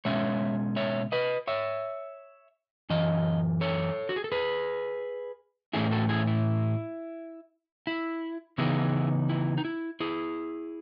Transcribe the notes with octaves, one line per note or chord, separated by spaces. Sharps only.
B2 G#3 C#4 C#5 E5
C#5 E5
B4 D#5
C#5 E5
F#2 E3 D#5
A4 C#5
F#4
G#4
A4
G#4 B4
A2 E3 A3 C#4 E4 G#4
F#4 A4
E4 G#4
E4
E4
C#3 E3 B3 D#4 E4 G#4
E4
D#4
E4
E4 G#4